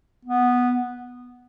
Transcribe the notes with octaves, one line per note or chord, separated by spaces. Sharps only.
B3